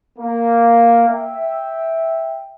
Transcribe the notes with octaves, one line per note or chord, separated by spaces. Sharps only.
A#3
E5 G5